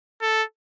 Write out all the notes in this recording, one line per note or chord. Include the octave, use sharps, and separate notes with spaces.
A4